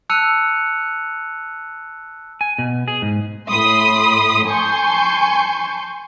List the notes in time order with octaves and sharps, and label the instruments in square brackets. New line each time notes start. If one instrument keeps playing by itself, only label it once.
[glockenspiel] A5 E6 F#6 C#7 D#7 F7
[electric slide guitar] G#5
B2
G#4
G#2
[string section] A2 B5 C6 D#6
G#5 A5 C6 C#6 G6